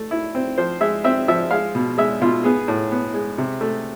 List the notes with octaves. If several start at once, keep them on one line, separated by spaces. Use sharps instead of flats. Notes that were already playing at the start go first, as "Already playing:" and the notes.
Already playing: A3
E4
C4
F3 C5
G#3 E5
C4 E5
F3 E5
G#3 F5
B2
G#3 E5
B2 F4
B3 G#4
A2
B3
G#3
C3
A3